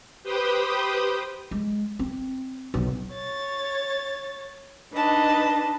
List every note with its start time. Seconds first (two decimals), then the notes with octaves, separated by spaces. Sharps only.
0.23 G4 B4 C5 G5 D#6
1.51 G#3
1.99 C4
2.74 B1
3.12 C#5 A6
4.93 D4 D#4 B4 D#5 A5